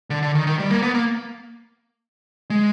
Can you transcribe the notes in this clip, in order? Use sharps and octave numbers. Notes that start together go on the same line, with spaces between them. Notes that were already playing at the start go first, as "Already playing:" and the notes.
D3
D3
D#3
D#3
G3
A#3
B3
A#3
G#3